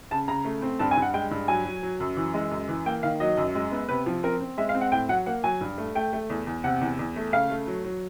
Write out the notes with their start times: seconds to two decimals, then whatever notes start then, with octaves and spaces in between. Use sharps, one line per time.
0.11 C#3 A5
0.28 C#3 A#5
0.45 A3
0.62 C4
0.79 G2 A5
0.91 G#5
0.97 G2
1.02 F#5
1.14 G#3 G5
1.31 G2
1.48 F#3 G#5
1.65 F#3
1.83 F#3
2.00 F#2
2.17 E3
2.34 G#3
2.51 F#2
2.69 E3
2.86 A#3 G5
3.03 D#3 F5
3.20 F#3 D#5
3.37 F#2
3.55 G#3
3.72 B3
3.89 C3 B4
4.06 F3
4.23 C4 A#4
4.41 C4
4.58 G#3 E5
4.69 F5
4.75 C4
4.81 F#5
4.92 A2 G5
5.09 F#3 F#5
5.26 A#3 F#5
5.44 F#3 G#5
5.61 G2
5.78 A3
5.95 A3 G5
6.13 A3
6.30 E2
6.47 E2
6.64 C3 F#5
6.81 E2
6.99 E2
7.16 A3
7.33 C#3 F5
7.50 A3
7.67 F#3
7.84 F#3